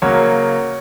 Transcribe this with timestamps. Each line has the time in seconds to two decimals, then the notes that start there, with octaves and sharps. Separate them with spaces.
0.02 C#3 F#3 A#3 C#5